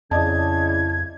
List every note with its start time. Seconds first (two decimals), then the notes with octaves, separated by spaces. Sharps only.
0.11 F2 C#3 E4 D5 D#5 A5 G#6